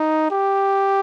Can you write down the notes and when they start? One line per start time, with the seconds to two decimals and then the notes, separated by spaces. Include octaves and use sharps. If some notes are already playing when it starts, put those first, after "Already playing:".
Already playing: D#4
0.31 G4